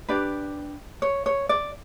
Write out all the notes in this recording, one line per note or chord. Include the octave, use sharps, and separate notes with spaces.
D4 G4 B4 D5
C#5
C#5
D5